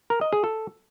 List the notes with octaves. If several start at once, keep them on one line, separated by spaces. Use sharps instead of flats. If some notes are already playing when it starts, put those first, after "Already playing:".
A#4
D#5
G#4
A4